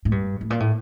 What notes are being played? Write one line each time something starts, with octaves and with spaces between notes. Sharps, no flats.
A2
G2
A2
A#2
A2